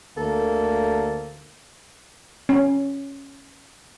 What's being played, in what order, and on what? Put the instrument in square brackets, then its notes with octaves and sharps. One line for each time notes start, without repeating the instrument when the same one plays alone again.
[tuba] D2 [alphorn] A#3 [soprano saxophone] A4
[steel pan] C#4